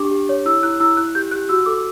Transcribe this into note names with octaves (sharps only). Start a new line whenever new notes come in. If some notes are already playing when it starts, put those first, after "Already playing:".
Already playing: D4 G4 D6
G4
C#5
E4 E6
E4 F#6
E4 E6
E4 F#6
G4 G6
G4 F#6
F#4 E6
A4 D6